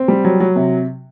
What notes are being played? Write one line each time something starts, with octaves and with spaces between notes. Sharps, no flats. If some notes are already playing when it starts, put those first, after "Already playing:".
Already playing: C4
G3
F#3
F#3
C3